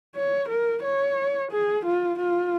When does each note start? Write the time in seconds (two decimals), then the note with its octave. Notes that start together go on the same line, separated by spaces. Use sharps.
0.16 C#5
0.49 A#4
0.83 C#5
1.51 G#4
1.86 F4
2.19 F4